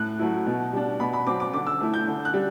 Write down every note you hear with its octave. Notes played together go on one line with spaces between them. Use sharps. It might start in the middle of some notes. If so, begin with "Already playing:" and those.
Already playing: A2 F#6
F#3 A3 E4
B2
G3 D4
B2 B5
B5
F#3 C4 D6
D6
D3 D6
E6
A3 E4
G6
D3
F#6
G3